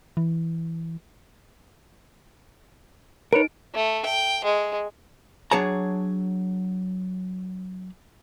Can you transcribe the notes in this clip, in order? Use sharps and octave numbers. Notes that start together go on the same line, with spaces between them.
E3
D#4 A#4 B4 C#5 D7
A3
G5
G#3
F#3 D4 G#4 C#5 A5 A#5